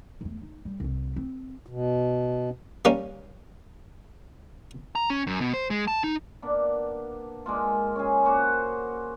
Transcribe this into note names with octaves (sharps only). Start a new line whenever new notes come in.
E2 A3
D#4
G3
C2 C3
C4
B2
G3 A#3 C#4
A#5
C#4
F#2
B2
C5
G#3
A5
D#4
A#3 B3 D4
G#3 A#3 F4
C#4 G#4
A#3 F#4 C5 F#5